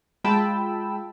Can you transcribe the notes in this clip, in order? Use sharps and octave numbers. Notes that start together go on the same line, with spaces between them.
G#3 F4 G5 A5 B5 E6